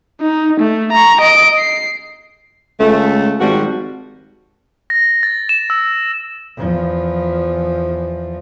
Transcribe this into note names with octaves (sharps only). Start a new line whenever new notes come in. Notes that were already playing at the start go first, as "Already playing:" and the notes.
D#4
A3
A#5 C#6
D#5 D7
C7
C#2 A3
G#1 F3 G3 F#4
A#6
A6
E7
E6
E2 F3